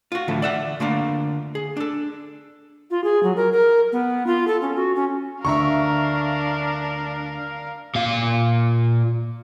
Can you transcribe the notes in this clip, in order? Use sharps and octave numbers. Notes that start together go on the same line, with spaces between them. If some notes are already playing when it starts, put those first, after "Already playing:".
F4 F#4
A2 D3 E3 F3 A3
D5 E5 F#5
D3 A3 A#3 D4 F4
G#4
D4 A4
F4
G#4
F#3
A#4
A#4
B3
F4
A4
C#4
F#4
C#4
D2 D3 D4 A#4 E5 F5 A#5 C#6
A#2 F5